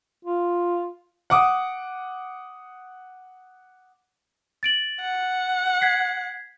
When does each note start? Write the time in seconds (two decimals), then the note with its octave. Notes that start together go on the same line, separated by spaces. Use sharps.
0.25 F4
1.30 F#5 D6 D#6
4.63 A6 D7 F#7
5.01 F#5
5.81 G#6 B6 C7